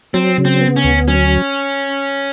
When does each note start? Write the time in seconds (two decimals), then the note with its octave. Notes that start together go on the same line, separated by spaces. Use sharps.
0.14 F#3 C4
0.38 C#3
0.45 C4
0.61 B3
0.76 C#4
0.84 D2
1.07 F#3 C#4